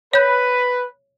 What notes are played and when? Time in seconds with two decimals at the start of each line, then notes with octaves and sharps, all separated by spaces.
0.13 B4 C#5 G6